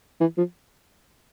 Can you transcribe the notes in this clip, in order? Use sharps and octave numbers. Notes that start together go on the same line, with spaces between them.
E3
F3